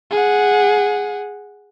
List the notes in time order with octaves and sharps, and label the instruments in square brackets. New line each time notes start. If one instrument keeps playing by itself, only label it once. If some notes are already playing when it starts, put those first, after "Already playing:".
[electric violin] G#4 F#5